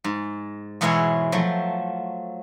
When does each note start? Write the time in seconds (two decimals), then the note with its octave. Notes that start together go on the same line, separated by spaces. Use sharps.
0.04 G#2
0.81 E2 B2 E3 G#3 E4 C#5
1.32 F3 F#3 A3